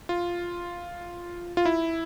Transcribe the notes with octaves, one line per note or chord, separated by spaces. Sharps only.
F4
F4
E4